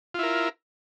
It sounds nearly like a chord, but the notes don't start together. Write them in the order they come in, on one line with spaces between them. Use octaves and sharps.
F4 E4 A#4